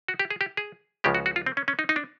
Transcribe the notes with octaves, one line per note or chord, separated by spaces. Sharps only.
F#4
G4
G#4
G4
G#4
C#2 C#3 F3 G#3 G4
F#4
F#4
F4
C4
C#4
C#4
D#4
D#4
D4